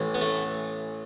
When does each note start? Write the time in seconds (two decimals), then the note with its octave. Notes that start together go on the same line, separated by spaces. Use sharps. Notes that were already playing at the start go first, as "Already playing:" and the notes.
Already playing: A1 A2 E3
0.14 B3
0.21 A3